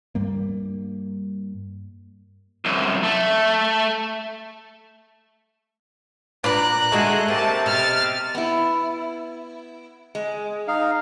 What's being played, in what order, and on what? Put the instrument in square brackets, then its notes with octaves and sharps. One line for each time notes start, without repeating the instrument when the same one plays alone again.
[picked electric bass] G2 G3 A#3
[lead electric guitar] C2 F#2
A3
[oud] A#2 [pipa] D4 B4 D5 [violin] A#5 F#6
[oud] D3 G#3 F#4 [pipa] A3 [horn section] G#4
[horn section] C3 [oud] A#3 [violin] A5
[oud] B2 [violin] F6 A6
[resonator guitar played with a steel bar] B3 E4
G#3
[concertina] D#4 F5